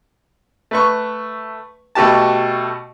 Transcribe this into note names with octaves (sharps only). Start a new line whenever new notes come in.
A3 B4 C#6
B2 A3 F#4 G4 A5